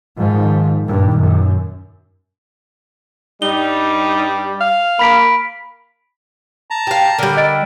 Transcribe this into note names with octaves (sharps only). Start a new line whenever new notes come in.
G#2 D#3 F3
G2 A#2
F#2
G2 G3 D#4 G7
F5
A#3 B5 B6 D7
A5 A#5
G4 F5
D3 G3 A#4
D#5 A6 D7